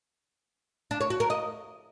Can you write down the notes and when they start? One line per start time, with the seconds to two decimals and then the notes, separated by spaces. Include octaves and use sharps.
0.91 D4
1.01 C#5
1.10 F#4
1.20 A#4
1.30 D#5